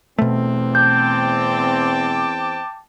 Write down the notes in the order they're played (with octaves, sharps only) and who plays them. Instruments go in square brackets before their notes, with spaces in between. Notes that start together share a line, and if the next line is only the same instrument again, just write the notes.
[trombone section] E2 C4 [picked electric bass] B2 A3
[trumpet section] G5 A5 D6 [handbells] G6